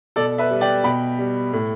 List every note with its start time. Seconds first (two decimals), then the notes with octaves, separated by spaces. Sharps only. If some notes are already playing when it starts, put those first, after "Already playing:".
0.16 B2 A4 D5
0.38 B4 E5
0.51 G3
0.61 D5 G5
0.84 B2 G5 B5
1.19 G3
1.53 A2